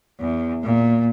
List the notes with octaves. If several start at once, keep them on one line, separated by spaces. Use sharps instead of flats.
E2
A#2